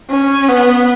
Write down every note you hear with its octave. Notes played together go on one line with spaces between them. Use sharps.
C#4
B3